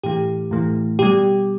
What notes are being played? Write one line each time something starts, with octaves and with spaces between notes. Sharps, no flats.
A2 E3 A3 G4
A2 E3 A3
B2 G3 G4